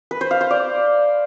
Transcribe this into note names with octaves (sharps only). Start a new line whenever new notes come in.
B4
C5
F5
C5
D5